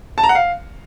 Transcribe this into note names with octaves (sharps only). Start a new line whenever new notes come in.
A5
A#5
F#5
F5